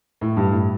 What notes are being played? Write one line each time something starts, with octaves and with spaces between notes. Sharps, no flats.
A2
G2
A2